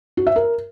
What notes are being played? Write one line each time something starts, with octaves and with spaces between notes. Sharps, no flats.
F#4
E5
A#4